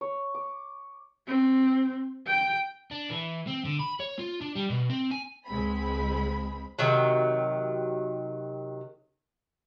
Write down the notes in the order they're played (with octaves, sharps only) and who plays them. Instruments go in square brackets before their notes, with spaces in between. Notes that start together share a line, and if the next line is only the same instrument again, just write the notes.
[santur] C#5
D6
[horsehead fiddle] C4
G5
[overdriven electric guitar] D4
E3
C4
D3
B5
C#5
F4
D4
G3
B2
C4
G#5
[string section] C#2 G#3 C4 B5
[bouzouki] C3 D#3 F#3